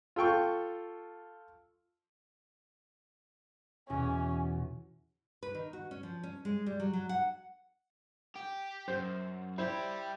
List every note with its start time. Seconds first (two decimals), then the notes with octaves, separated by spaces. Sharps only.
0.16 F4 A4 G5 C#6
3.90 E2 B2 C#4
5.43 B4
5.55 D#3
5.73 F#4
5.91 C#4
6.03 F3
6.23 C#4
6.45 G#3
6.66 G3
6.80 F#3
6.93 F#3
7.09 F#5
8.35 G4
8.88 F#2 C5
9.58 G3 E4 G4 C5